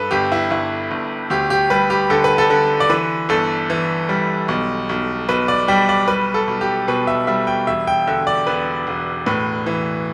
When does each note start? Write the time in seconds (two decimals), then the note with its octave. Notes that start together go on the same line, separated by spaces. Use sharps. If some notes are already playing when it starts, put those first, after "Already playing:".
Already playing: G2 A4 B4
0.11 G1 G4
0.32 E4
0.51 G1 E4
0.91 G1
1.30 D2 G4
1.50 G4
1.70 G3 B4
1.90 G4
2.10 D3 A4
2.24 B4
2.38 A4
2.50 D3
2.80 D5
2.89 E3 B4
3.29 G1 A4
3.70 E3
4.09 G3
4.48 B1
4.89 B1
5.28 B1 B4
5.48 D5
5.68 G3 G5
5.89 D5
6.08 G3 B4
6.34 A4
6.47 B1
6.61 G4
6.88 B2 B4
7.07 E5
7.27 G3 E5
7.47 G5
7.67 E1 E5
7.87 G5
8.07 D3 E5
8.27 D5
8.47 E1 B4
8.87 E1
9.26 A2 B4
9.66 E3